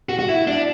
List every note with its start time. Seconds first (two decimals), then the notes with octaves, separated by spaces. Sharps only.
0.09 F#4
0.19 F#4
0.29 E4
0.47 D4